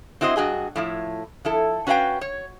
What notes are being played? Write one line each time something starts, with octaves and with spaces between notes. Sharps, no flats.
C4 E4 F#4 C5 D#5
G2 F#4 G#4 D#5
A2 F3 E4
F3 E4 A4
C#4 F#4 B4 E5 F5 G5
C#5